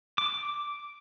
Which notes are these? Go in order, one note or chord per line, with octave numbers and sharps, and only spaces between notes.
D6